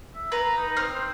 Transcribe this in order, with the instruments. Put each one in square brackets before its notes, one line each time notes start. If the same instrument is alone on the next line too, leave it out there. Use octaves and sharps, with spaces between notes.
[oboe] E5
[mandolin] B4 [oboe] A#5
[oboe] D#4
[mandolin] C4 F6
[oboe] C5